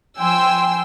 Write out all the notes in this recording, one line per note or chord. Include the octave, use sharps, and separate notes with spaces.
F3 G5 G#5 C6 E6